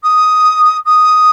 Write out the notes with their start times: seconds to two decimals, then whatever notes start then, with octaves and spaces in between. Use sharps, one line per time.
0.03 D#6
0.85 D#6